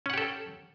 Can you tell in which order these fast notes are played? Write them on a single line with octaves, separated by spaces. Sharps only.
C#4 F#5 G4 A4